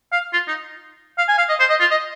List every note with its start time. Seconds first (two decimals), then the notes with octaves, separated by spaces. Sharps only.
0.12 F5
0.33 F4
0.48 D#4
1.18 F5
1.28 G#5
1.38 F5
1.49 D#5
1.60 C5
1.70 D#5
1.80 F4
1.91 D#5